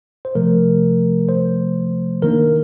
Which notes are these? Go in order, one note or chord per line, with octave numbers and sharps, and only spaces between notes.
C5
C3 F3 A3 A#4
C5
D#3 A#3 D4 A#4